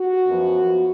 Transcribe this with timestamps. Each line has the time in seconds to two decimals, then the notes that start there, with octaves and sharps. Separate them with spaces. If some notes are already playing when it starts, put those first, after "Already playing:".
Already playing: F#4
0.27 F#2 F3 B3